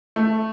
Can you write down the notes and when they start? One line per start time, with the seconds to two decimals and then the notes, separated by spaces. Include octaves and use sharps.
0.16 A3